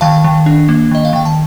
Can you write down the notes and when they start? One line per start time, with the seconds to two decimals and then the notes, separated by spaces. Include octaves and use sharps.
0.01 D#3 F5 A5
0.24 D#3
0.46 D4
0.69 A#3
0.91 D#3 D#5
1.05 F5
1.13 D#3 G5
1.25 A5